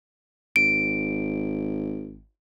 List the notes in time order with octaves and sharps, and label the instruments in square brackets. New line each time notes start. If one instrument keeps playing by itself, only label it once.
[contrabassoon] G#1 [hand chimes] D7